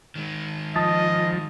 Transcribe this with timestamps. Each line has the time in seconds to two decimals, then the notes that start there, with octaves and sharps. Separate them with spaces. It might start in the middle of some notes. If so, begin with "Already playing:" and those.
0.15 D#3 G#3
0.76 F3 D#5 A5 D#6 A6